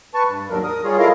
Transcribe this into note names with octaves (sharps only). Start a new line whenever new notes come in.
B4 A5 C#6
G2
D#2 G#2 F#3 G3 D4 A#4
A#4 D#6
G3 F4 G#4 C#5
A3 E4 F4 A#4 D#5 F5